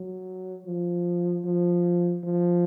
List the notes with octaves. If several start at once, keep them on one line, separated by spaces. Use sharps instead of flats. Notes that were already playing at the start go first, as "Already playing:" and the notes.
Already playing: F#3
F3
F3
F3